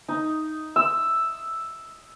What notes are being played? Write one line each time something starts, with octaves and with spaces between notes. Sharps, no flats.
D#4
E6